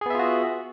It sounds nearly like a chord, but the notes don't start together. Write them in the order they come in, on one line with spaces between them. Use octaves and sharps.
G#4 B3 E5 F4 F#4